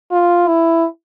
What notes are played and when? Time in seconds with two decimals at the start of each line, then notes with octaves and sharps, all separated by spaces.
0.12 F4
0.48 E4